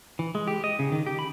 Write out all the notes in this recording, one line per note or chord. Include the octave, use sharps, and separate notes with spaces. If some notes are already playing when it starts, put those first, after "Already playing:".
E3
G#3
G4
D#5
C#3
D#3
G4
B5